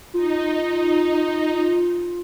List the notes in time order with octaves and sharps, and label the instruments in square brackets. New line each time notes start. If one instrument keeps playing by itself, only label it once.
[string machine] D#4 [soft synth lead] F4